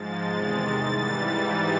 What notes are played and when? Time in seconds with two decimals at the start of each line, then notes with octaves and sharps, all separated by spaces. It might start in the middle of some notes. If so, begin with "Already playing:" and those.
Already playing: G#2 F3 G#3 A6
0.26 E2 C3 D#3 G#3 A6
0.72 G#2 E3 G3